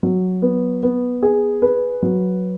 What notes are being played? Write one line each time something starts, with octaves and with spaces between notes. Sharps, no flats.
F#3
B3
B3
G#4
B4
F#3